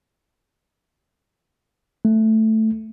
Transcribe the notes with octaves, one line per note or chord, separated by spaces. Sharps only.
A3